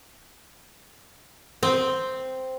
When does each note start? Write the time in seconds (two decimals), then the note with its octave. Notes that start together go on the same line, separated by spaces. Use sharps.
1.63 C4